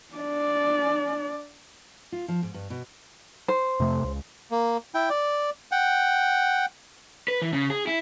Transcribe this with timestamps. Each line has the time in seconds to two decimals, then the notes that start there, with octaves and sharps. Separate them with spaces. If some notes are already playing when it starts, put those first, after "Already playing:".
0.14 D4 D5
2.12 F4
2.28 F3
2.42 G#2
2.54 G2
2.70 B2
3.48 C5
3.80 F2 C3 A3
4.04 C#2
4.51 A#3
4.95 E4 G5
5.10 D5
5.72 F#5 G5
7.28 B4
7.42 E3
7.53 C#3
7.70 G#4
7.87 E4